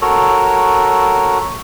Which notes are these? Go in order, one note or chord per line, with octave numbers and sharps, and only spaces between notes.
F#4 A4 A#4 C#5